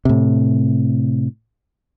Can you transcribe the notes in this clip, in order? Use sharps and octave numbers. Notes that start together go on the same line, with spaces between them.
A2 C3